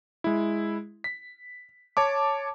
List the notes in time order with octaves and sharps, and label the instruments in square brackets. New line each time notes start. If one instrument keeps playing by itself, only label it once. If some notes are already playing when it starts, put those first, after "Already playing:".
[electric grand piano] G#3 E4
B6
C#5 A5 D6